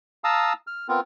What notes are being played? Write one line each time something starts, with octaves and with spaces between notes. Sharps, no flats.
F5 A5 A#5 D#6 E6
F6
B3 C4 F4 A#4